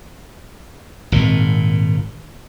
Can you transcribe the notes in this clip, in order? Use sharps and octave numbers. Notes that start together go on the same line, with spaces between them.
G#1 A#2